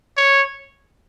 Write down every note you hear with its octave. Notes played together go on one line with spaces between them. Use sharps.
C#5